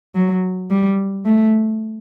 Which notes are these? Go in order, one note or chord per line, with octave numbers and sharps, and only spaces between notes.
F#3
G3
A3